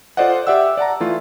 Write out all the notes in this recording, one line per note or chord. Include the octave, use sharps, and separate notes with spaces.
F4 A4 C5 D5 D#5 F#5
G4 D5 E5 F#5 E6
D5 F#5 A5 A#5
E3 A3 F4